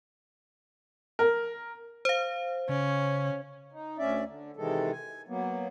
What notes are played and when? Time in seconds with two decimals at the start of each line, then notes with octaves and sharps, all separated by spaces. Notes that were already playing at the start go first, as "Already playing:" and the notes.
1.19 A#4
2.05 C5 F5
2.69 C#3 C#4
3.72 D#4
3.99 D2 C#4 D5 E5
4.27 D3
4.57 C3 D#3 E3 G#3 A4
4.92 G#5
5.28 F#3 A#3 B3